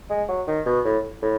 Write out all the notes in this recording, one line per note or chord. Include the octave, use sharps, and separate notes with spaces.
G#3
F#3
D#3
B2
A2
A2